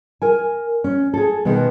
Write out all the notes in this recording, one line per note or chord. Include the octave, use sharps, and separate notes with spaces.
A#4 G#5
C#4
G#4 A4
B2 D#3 G#3 B3